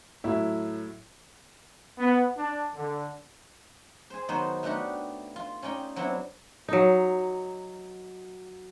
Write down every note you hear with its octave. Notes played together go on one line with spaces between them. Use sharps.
A2 F#3 E4
B3
D4
D3
G#4 C5
D#3 F#3 B3 D#4 F#4 C5
A3 B3 D4 D#4 F#4 G4
F4
C#4 D#4 D5 G5
F#3 B3 C4 D4 E4
F#3 D#4